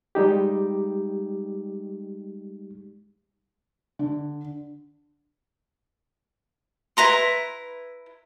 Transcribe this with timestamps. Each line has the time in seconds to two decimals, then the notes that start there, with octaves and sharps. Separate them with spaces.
0.15 G3 G#3 D#4 G4
3.99 D3
6.97 E4 B4 A#5 C6